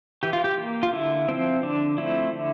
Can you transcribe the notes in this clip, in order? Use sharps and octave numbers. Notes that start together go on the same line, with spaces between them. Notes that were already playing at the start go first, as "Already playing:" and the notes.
E3 G4
F4
G4
A#3
F4
D3 E4
F3 A3 C4
D3 D4
F3 A3 C4 E4
D3